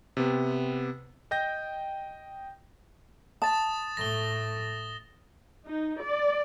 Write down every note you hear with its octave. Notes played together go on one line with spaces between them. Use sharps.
C3 B3
D#5 G5 G6 A#6
A5 D#6 A6 E7
A2 A3 A#6 G7
D#4
D5